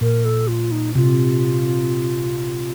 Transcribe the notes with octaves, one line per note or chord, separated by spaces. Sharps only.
A#2 A#4
A4
F4
D#4
C3 F4